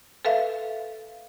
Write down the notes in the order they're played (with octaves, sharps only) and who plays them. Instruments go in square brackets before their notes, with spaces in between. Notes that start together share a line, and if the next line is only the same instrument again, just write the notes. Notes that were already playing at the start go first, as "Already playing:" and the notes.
[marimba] A4 B4 E5 F5